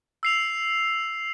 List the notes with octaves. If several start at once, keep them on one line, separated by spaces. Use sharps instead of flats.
E6 C7 F7